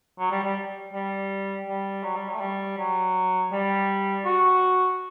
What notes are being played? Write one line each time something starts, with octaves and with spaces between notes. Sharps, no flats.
F#3
G3
G3
G3
G3
F#3
G3
F#3
A3
G3
F#3
G3
F#4